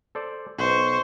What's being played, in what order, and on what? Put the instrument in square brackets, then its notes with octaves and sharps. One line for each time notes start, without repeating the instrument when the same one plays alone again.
[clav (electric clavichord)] A4 C5 D5
[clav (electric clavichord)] B1 [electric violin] C5 C#6